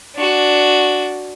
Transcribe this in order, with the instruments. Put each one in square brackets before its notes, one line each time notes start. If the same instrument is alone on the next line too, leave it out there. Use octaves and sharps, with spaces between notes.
[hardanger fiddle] D4 F#4